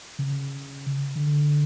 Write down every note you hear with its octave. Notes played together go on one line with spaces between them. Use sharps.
C#3
D3